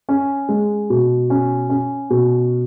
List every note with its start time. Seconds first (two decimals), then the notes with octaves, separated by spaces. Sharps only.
0.09 C#4
0.49 G#3
0.90 B2
1.30 C#4
1.70 C#4
2.10 B2